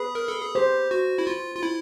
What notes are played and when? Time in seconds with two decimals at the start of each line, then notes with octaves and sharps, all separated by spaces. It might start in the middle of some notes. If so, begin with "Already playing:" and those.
Already playing: G#4 B4
0.15 A#4
0.28 A4
0.42 G#4
0.55 G4 C5
0.91 F#4
1.18 E4
1.27 F4
1.56 F4
1.63 E4